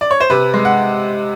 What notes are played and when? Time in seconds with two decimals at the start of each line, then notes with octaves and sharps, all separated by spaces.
0.01 D5
0.11 C#5
0.20 C5
0.30 C3 B4
0.54 G#3
0.65 F#5